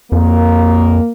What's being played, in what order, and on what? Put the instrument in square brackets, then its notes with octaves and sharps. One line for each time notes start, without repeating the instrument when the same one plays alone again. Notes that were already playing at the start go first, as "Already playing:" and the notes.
[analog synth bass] F2 [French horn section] A#3